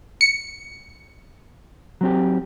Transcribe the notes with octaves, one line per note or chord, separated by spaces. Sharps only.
C#7
F#3 C4 G4